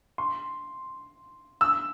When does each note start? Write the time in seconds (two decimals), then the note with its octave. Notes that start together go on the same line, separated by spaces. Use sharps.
0.18 C6
1.61 E6